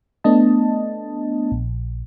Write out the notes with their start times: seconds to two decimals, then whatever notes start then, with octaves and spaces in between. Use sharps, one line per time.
0.24 A3 B3 D4 D#5 A5
1.52 A#1